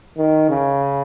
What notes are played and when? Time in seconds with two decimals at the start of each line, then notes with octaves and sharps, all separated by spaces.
0.18 D#3
0.50 C#3